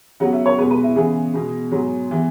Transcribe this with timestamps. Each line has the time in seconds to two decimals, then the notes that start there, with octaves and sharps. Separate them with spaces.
0.20 C#3 F#3 B3 F#5
0.33 E5
0.46 C#5
0.58 B2 G#3 B3 B4
0.71 B4
0.83 E4
0.96 C#3 E3 B3 G#4
1.34 B2 G#3 B3
1.71 G#2 F#3 B3
2.11 E3 B3